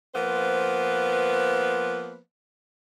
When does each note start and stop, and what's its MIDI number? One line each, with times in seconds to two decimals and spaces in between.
0.15 2.18 53
0.15 2.18 58
0.15 2.18 59
0.15 2.18 71
0.15 2.18 72